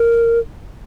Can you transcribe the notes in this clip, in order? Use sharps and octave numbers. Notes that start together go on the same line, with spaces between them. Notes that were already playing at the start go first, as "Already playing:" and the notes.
Already playing: A#4